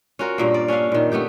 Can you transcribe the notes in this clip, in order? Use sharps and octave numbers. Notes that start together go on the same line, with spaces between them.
C#4 F4 F#4 A#4
G2 A#2 A#3
D5
C#4 D4 E5 F5
A#2 D#3
A3 B3 G4 G5